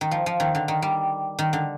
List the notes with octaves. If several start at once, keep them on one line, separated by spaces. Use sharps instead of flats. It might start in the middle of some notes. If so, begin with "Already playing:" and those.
D#3
F3
F3
D#3
D3
D#3
G3
D#3
D3